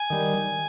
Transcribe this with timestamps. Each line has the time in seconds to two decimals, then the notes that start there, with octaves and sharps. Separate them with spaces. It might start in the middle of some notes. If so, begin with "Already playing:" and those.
Already playing: G#5
0.10 D#3 G3